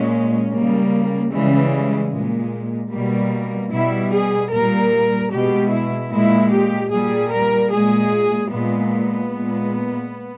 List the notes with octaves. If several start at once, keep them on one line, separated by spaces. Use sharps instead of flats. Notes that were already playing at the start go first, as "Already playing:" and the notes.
Already playing: A#2 G#3 C#4
C#3 G3 A#3
C#3 E3 G3 G#3
A#2 G#3
B2 G3 A#3
B2 G3 E4
G#4
A#2 G3 A#4
B2 G#3 G4
E4
A#2 G#3 E4
G4
A#2 G3 G#4
A#4
A#2 G#3 G#4
A#2 G#3 B3
A#2 G#3